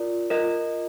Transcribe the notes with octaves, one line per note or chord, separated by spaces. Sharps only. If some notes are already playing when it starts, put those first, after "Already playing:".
Already playing: F4 A#4 D5
F4 A#4 D#5